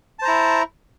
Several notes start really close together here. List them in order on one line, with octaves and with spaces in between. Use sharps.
A5 C5 A#5 E4